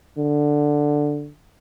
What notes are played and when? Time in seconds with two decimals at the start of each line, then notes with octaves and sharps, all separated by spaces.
0.18 D3